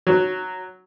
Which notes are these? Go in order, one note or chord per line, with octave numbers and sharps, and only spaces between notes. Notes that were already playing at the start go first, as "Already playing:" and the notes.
F#3